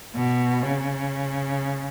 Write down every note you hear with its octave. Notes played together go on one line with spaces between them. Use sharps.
B2
C#3